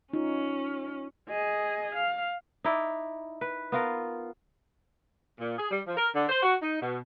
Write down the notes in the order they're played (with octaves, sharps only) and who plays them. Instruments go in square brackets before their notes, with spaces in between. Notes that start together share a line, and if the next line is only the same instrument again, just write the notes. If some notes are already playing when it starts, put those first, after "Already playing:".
[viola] C#4 [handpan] D#4 F4
[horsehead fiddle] G#4 D#5
F5
[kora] D#4 E4 D5
B4
B3 F4 A#4
[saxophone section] A#2
G#4
G3
F3
A#4
D3
C5
F#4
D#4
B2